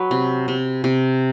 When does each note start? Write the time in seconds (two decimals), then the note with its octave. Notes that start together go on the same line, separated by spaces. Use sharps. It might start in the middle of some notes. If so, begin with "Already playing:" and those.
Already playing: F#3 B4
0.11 C3
0.48 C3
0.84 C3